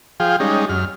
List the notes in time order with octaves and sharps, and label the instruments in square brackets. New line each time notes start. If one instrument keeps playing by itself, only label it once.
[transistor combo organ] F3 G#4 F5 G5
G3 G#3 C#4 D#4
F#2 F6